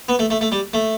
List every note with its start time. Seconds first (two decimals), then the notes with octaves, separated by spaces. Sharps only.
0.09 B3
0.19 A3
0.30 A3
0.41 A3
0.52 G3
0.73 A3